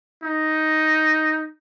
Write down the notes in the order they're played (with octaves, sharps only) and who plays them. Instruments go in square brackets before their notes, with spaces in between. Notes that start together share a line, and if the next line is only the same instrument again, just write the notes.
[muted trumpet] D#4